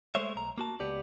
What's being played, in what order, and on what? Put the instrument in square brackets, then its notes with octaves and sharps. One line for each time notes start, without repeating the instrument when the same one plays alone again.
[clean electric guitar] G#3 A3 C5 C#5 E5
B1 A#5
A#3 F#4 A5
C#2 B3 G4 D5